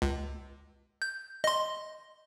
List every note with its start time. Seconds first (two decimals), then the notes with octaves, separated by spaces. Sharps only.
0.02 C#2
1.02 G6
1.44 D#5 C6